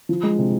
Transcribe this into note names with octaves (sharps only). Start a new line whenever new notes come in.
F3
G#3
C3